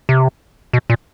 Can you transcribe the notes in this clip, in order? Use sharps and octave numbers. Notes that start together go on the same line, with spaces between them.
C3
B2
A#2